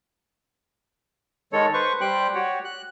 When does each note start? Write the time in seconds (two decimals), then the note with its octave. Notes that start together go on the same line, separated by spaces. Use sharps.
1.53 D#3 G#3 A4 C#5
1.73 B4 C5 C#6
2.01 G3 G4 C5 G5 F#6
2.34 F#4 G4 C#5
2.64 F#6